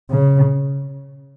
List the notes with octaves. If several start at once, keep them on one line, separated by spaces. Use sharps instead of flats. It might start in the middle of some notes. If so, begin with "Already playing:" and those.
C#3